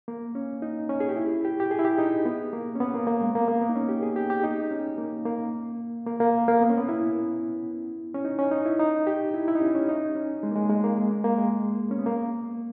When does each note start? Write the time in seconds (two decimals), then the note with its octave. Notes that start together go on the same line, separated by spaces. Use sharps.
0.08 A#3
0.35 C#4
0.62 D#4
0.89 C#4
1.00 G#4
1.09 G4
1.16 E4
1.45 G4
1.60 G4
1.71 G#4
1.79 E4
1.85 G4
1.99 D#4
2.26 B3
2.53 A#3
2.75 C#4
2.80 B3
2.94 A#3
3.07 A#3
3.21 G#3
3.35 A#3
3.48 A#3
3.61 B3
3.69 D#4
3.75 C#4
3.89 G4
4.03 G#4
4.16 G4
4.30 G4
4.44 D#4
4.71 C#4
4.98 A#3
5.26 A#3
6.07 A#3
6.20 A#3
6.48 A#3
6.61 B3
6.70 C#4
6.77 B3
6.89 E4
8.15 C#4
8.25 D#4
8.39 C#4
8.51 D#4
8.66 E4
8.80 D#4
9.07 G4
9.34 E4
9.48 E4
9.55 D#4
9.61 C#4
9.75 C#4
9.89 D#4
10.15 C#4
10.43 G#3
10.51 A#3
10.56 G#3
10.70 G#3
10.84 A#3
10.97 G#3
11.11 A#3
11.24 A#3
11.38 G#3
11.91 C#4
11.98 B3
12.06 A#3